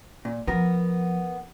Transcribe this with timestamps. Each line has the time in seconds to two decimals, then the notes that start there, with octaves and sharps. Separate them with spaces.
0.25 A#2
0.47 F3 B3 A#4